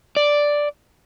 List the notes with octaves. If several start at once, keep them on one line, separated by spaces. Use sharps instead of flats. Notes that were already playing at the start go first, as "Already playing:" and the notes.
D5